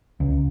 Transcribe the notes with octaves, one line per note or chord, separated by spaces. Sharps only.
C#2